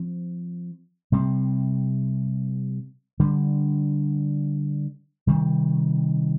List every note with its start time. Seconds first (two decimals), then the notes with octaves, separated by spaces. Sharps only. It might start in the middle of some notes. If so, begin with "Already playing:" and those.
Already playing: F3 C4
1.12 C3 G3 C4
3.20 D3 G3 D4
5.27 C3 D#3 G3